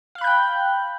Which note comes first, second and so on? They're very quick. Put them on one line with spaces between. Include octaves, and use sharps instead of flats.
F5 F#6 B5 G6 G5